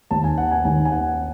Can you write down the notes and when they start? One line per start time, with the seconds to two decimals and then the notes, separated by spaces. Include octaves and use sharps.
0.11 D#2 D#3 A5
0.24 G#5
0.38 F#5
0.51 G#5
0.65 D#2 D#3 G#5
0.85 G#5
0.92 F#5